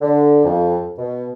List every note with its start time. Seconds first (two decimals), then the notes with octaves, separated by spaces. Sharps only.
0.01 D3
0.44 F2
0.98 B2